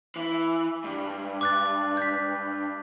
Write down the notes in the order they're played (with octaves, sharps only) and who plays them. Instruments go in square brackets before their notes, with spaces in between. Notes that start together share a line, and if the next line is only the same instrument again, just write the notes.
[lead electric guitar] E3
G2
[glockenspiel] D6 F#6 A6
G6 B6